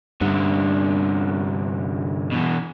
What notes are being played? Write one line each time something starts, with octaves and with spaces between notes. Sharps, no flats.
C2 G2 D3
B2 E3